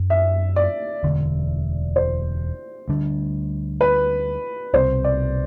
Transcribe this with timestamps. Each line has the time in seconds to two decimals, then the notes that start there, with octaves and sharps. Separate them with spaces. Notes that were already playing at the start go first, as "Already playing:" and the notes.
Already playing: F#2 F#3
0.10 E5
0.56 D5
1.03 E1 D2 D3
1.96 C5
2.88 D2 D3 G3 D4
3.81 B4
4.73 C2 B2 G3 C4 C5
5.04 D5